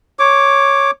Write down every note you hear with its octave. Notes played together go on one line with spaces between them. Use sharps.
C#5 D6